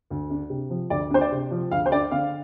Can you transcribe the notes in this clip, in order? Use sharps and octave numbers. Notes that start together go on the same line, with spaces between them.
D2
D4
C3
F3
D2 D5
D4 C5
D5
C3
F3
D2 F5
C5
D4 D5
D3 F5